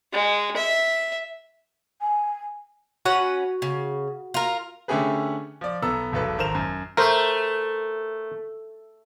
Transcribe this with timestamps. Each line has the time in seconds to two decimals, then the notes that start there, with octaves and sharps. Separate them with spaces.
0.13 G#3
0.57 E5
2.02 G#5
3.05 C#4 F#4 B4 F#5
3.62 C#3
4.34 F4 A#4
4.88 D3 A3 C#4 G4 G#4 B4
5.61 F3 D5
5.82 B1 B3 A4 A#5 E6
6.12 E1 B1 A4 B4
6.38 G#1 A#4 C5 E7 F7
6.55 F#2
6.97 A3 A#4 C5